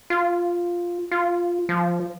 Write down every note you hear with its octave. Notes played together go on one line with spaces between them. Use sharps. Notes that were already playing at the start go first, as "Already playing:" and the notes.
F4
F4
F3